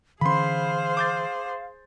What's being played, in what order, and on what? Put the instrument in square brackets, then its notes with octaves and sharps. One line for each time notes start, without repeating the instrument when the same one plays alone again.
[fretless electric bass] D3 E3 C#4 [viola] G#4 C5 [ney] F5 [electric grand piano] B5 C6
[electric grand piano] D6 G6 A6